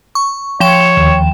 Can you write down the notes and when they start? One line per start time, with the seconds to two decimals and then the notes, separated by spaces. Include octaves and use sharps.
0.15 C#6
0.60 F3 C#5 G5 E7
0.97 D#2